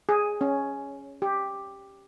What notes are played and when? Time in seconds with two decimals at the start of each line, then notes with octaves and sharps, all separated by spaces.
0.09 G#4
0.41 C#4
1.22 G4